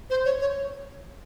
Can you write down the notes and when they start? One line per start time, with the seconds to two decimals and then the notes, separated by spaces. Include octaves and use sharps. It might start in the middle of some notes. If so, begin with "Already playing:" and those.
0.10 C5
0.25 C#5
0.41 C#5